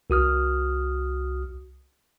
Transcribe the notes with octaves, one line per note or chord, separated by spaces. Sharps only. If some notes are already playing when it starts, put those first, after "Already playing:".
C2 F#4 D#6 F6